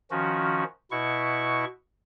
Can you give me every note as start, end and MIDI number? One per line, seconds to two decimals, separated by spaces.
0.11 0.64 51
0.11 0.64 53
0.11 0.64 61
0.11 0.64 66
0.91 1.65 47
0.91 1.65 64
0.91 1.65 85